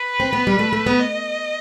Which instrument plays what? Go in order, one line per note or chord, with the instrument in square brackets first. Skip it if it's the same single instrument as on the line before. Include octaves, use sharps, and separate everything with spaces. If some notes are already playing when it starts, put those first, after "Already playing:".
Already playing: [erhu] B4
[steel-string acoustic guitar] C4
B3
G3
A3
A3
B3
[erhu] D#5